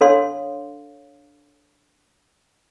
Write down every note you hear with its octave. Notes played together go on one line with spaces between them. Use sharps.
D4 A4 C#5 F5 C6